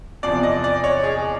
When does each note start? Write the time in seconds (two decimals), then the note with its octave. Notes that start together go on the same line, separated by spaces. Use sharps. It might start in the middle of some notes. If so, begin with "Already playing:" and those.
0.23 E2 C3 F3 D5
0.43 D#5
0.64 D5
0.84 C#5
1.04 G#4